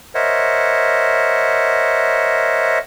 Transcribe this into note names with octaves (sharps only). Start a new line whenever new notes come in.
A#4 C5 C#5 D#5 E5 F#5